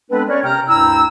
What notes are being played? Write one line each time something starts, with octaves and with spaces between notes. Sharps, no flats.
G#3 B3 C4 D4 A4 B4
C#4 A#4 C#5 D5
C3 G5 A#5 F6
D2 G2 E4 G5 A#5 E6